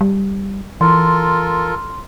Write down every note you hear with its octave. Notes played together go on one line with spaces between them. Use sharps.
G3
E3 F4 A4 A#4 C6